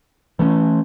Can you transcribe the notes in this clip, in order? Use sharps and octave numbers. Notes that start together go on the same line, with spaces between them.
E3 A3 C#4